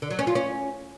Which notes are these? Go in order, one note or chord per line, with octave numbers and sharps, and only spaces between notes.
D3
F#3
C#4
F4
C#4